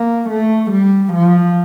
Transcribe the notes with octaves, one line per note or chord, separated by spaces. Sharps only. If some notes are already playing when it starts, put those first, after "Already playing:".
Already playing: A#3
A3
G3
F3